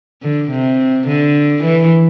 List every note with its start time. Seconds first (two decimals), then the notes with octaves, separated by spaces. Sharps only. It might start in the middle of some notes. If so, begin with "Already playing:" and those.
0.22 D3
0.51 C3
1.07 D3
1.64 E3